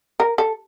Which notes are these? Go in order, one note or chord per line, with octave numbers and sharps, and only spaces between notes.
A#4
A4